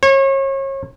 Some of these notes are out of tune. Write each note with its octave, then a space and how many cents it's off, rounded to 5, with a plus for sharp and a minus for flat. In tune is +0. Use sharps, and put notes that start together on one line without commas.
C#5 -35